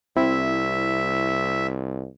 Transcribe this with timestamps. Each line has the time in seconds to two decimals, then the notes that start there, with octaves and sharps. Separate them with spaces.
0.17 C2 C4 E4 E5